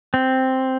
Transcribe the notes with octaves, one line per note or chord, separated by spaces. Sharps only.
C4